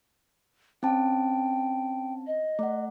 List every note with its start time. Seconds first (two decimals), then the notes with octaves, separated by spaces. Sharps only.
0.83 C4 C#4 G5 A5
2.27 D#5
2.59 A3 F#5